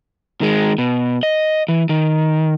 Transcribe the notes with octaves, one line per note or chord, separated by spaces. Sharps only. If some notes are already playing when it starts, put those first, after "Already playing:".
D#3 G#3
B2
D#5
E3
D#3